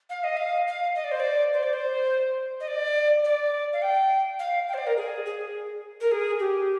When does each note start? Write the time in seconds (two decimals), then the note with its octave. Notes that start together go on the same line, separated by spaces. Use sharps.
0.10 F5
0.24 D#5
0.37 F5
0.67 F5
0.96 D#5
1.04 D5
1.12 C5
1.20 D5
1.53 C5
1.63 D5
1.73 C5
2.60 D#5
2.68 D5
3.24 D5
3.73 F5
3.82 G5
4.39 F5
4.68 G5
4.74 C5
4.78 D5
4.87 A#4
4.97 G#4
5.25 G#4
6.01 A#4
6.12 G#4
6.39 G4